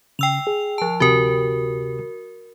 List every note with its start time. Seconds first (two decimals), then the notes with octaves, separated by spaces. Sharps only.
0.19 C#3 G5 E6 F7
0.47 G#4
0.78 F3 A5
1.00 D2 C3 F#4 G4 A#4